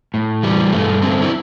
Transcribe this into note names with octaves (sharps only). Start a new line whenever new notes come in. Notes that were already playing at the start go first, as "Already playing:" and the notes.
A2
E3 G3
G2 A3
D3 C4
E4